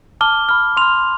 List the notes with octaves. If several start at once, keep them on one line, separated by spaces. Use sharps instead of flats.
A5 D6 F6 G7
B5 F6
C6 F6 F7